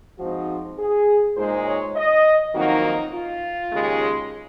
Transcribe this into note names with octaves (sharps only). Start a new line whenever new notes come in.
G#2 F3 C4 D#4 F#4
G#4
A#2 G#3 D#4 C5
C#5
D#5
F2 D#3 F#3 A#3 D#4 F#4
D#4
F4
D#2 C#3 G#3